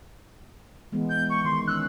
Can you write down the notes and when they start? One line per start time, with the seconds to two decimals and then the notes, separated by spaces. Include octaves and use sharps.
0.92 E3 G#3 B3
1.09 G6
1.30 C#6
1.44 D#3 C6
1.67 C#4 E6 F#6